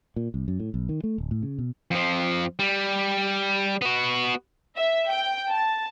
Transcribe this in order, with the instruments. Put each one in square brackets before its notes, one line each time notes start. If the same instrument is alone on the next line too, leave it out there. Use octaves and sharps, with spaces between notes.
[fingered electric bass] A#2
C2
F#2
A2
B1
D#3
A3
D1
A2
C#3
B2
[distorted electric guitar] F2 F3
G3
B3 F#4
[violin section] E5
G5
A5